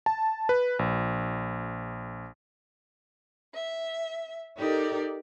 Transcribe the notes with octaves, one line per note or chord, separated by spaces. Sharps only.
A5
B4
A#1
E5
D#4 G4 A4 A#4 D5